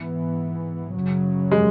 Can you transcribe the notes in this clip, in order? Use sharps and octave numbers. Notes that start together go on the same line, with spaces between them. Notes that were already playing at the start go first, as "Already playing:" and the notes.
Already playing: G#2 E3 B3
F#2 C#3 F#3
G#3